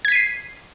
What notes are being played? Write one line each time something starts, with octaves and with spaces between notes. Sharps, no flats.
G#6 B6 C7 D#7